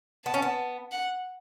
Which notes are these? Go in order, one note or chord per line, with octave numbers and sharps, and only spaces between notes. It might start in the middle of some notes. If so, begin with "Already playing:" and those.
B3 A5
C#4
B3
F#5